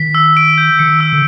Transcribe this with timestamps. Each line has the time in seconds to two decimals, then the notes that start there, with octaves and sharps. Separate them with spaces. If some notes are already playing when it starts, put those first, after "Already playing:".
Already playing: D#3 B6
0.15 E6
0.37 D7
0.58 G6
0.79 D#3 C#7
1.00 E6
1.13 D3